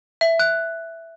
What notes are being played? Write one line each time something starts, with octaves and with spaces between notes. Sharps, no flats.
E5
F#6